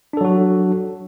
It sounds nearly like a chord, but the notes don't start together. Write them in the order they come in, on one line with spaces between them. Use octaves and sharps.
D4 A4 F#3 F#4